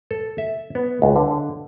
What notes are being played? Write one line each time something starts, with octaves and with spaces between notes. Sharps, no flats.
A4
E5
B3
C#2
D3